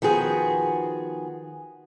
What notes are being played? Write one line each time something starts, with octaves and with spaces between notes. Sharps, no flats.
D#3 F3 B3 F#4 G#4